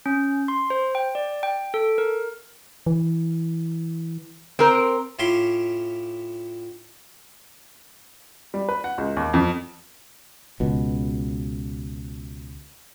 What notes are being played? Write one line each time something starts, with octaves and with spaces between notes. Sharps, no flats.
C#4
C6
C5
G5
D5
G5
A4
A#4
E3
C4 A#4
A2 C#4 F4 E5 C6 D6
G3
B4
F#5
C#2
D#2
F2
C#2 B2